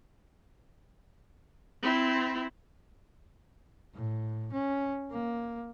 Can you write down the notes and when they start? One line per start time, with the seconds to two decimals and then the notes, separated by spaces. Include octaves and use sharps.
1.82 C4 E4
3.94 A2
4.53 C#4
5.11 A#3